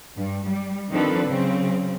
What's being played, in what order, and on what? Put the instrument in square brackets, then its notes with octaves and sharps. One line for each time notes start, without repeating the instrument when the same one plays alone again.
[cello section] G2
G3
D#3 F3 C4 D4 A4 B4
C#3 F#3 C4